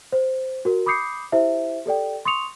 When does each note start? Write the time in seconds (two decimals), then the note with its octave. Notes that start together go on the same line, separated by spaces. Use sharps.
0.12 C5
0.65 F#4 A#4
0.86 B5 D6 D#6 G6 C7 C#7
1.32 E4 G4 C5 E5
1.86 G4 A4 D5 G5
2.25 C6 C#6 D#6 C#7 F7